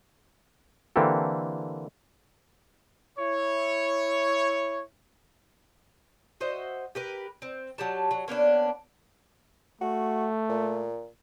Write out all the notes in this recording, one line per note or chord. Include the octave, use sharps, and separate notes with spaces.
D3 E3 A#3 C4 G4 A4
E4 C#5
F#4 C5 D#5 E5
G4 A#4 B4
C4
F#3 G4 A5
F#3
A#3 B3 C#4 D4
A3 F#4
A#2